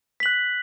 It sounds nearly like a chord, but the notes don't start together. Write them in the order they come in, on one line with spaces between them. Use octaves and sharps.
B6 F#7 F#6